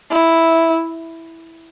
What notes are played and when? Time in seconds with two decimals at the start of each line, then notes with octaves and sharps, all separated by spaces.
0.11 E4